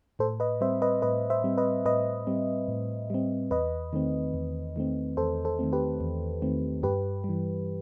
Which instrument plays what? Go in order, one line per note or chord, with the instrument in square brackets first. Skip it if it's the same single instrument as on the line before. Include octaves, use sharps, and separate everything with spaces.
[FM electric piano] A2 A4 C5
B4 D#5
G3 C4 C5 E5
B4 D#5
A2 B4 D#5
C5 E5
G3 C4
B4 D#5
A2 B4 D#5
G3 C4
A2
G3 C4
E2 B4 D#5
D#3 A3 C4
E2
D#3 A3 C4
E2 A4 C5
A4 C5
D#3 A3 C4
G4 B4
E2
D#3 A3 C4
G2 G4 B4
G3
E3